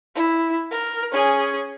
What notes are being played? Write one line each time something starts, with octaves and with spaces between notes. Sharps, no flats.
E4
A#4
C#4 G#4